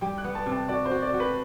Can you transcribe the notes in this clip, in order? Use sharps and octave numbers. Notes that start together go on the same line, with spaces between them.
G3 G5
F#6
B3
A5
C3
A5
F#4 D5
C5
F#4
D5
F#4
B4